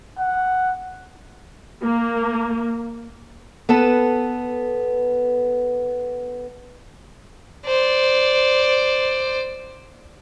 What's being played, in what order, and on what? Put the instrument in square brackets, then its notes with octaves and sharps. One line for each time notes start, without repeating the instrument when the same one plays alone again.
[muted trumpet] F#5
[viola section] A#3
[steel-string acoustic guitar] B3 A4 B4 A5
[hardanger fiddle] C5 D5